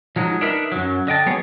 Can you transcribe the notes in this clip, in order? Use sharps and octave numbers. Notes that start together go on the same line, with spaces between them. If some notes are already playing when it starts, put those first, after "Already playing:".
F3 F#3 G#3 D#4
D4 D#4 A#4 B4 E5
F#2 F#3
D3 D#5 G5 A5
F#3 B3 G#4 C#5